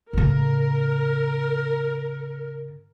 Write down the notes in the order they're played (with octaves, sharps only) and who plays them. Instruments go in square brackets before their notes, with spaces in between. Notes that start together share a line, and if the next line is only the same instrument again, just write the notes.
[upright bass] A2 C#3 [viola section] A#4